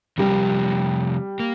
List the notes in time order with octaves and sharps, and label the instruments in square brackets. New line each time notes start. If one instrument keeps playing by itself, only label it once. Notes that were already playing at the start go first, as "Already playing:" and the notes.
[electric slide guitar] C3 F3 C4 A#4 [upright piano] G3
[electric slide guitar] A#3